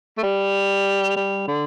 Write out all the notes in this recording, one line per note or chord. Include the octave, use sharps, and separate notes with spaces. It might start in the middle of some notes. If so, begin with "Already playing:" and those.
A3
G3
G3
D3